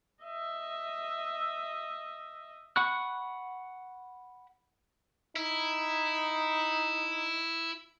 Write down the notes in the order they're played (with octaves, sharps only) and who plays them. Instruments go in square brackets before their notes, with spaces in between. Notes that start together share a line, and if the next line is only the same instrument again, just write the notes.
[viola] D#5 E5
[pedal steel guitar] F#5 B5 C#6 F#6
[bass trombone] D#4 [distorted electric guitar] E4